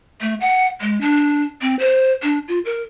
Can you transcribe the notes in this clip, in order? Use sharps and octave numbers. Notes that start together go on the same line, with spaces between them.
A3
F#5
G#3
D4
C4
C5
D4
F4
A#4